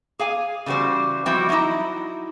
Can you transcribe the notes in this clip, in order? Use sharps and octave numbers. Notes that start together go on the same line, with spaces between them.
G#4 F5 G#5
C#3 E3 G3 F#4 C5
E3 F3 G3 C4 E4 F#4
F#3 G#3 C#4 D#4 E4